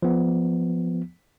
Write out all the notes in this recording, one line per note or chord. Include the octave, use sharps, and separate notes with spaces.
F3 B3